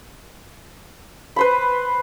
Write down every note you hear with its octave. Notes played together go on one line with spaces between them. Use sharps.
B4 C5 B5